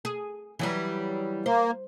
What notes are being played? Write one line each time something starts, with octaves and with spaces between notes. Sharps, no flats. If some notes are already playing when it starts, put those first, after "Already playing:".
G#4
E3 F#3 G3
A#3 C5